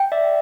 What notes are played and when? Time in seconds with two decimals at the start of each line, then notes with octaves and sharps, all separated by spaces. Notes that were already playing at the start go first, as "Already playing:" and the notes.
Already playing: G5
0.12 D5 E5